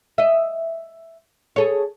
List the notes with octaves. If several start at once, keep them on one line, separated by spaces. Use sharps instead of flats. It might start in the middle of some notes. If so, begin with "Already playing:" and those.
D#5 E5
G#4 A4 C#5